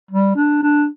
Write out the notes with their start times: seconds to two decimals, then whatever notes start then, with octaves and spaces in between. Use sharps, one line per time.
0.10 G3
0.36 D4
0.63 D4